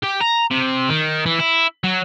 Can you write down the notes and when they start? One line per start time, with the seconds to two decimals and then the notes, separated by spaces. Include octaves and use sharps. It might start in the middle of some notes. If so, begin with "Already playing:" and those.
0.03 G4
0.20 A#5
0.51 C3
0.89 D#3
1.26 E3
1.39 E4
1.84 F#3